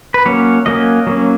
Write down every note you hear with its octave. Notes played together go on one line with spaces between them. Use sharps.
B4
F#3 A#3 C#4 C#5
F#3 A#3 C#4 D#5
F#3 A#3 C#4